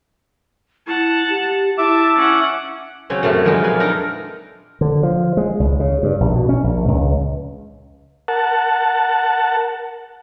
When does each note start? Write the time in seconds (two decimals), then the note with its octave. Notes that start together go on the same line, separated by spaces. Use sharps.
0.87 E4 F#5 A5
1.29 G4
1.78 E4 E5 A5 D6
2.16 C#4 F#5
3.10 C#3 F#3 C4 C#4
3.23 F#2 C#3 A3 C4 A5
3.45 F2 A#2 F#3 G#3 D#4
3.64 B4 D5 F5 G#5
3.80 D4 D#4 A4 A#4 A#5
4.81 D3
5.03 F3
5.37 G#3
5.60 C#2
5.80 C#3
6.03 G2
6.20 A#1
6.36 B2
6.49 C#4
6.64 A#1
6.88 C#2
8.28 A#4 F#5 A5